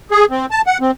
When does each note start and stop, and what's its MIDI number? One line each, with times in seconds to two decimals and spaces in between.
0.11 0.25 68
0.30 0.46 60
0.51 0.61 81
0.66 0.78 78
0.81 0.91 60